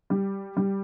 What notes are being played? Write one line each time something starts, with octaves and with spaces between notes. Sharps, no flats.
G3
G3